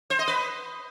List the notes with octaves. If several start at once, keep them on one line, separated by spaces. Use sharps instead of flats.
C5
D#5
B4